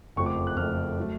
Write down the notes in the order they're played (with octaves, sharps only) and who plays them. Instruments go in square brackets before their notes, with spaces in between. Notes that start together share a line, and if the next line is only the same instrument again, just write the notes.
[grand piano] F#1 F2 F3 A3 C#6
D6
F#6
F#1 F2 F3 A3 F6
F#3 A3